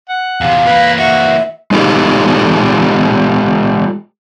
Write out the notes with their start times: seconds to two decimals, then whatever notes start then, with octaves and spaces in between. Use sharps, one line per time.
0.09 F#5
0.41 E2 C3 F5
0.66 E3 A#3 B4
0.99 F#4 E5
1.71 G#3 D#4 F4 G4 A4